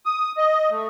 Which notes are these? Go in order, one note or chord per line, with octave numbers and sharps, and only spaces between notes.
D#6
D#5
A3